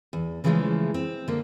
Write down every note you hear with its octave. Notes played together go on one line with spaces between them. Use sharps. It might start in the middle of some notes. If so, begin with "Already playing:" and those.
E2
C#3 E3 F3 G#3 A3 C#4
C4
D3 A#3